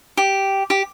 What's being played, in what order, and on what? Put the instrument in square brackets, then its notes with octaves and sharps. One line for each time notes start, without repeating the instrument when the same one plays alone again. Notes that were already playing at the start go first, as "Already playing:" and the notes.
[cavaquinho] G4
G4